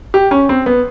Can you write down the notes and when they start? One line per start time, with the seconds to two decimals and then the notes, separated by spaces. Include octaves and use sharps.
0.14 G4
0.31 C#4
0.49 C4
0.66 B3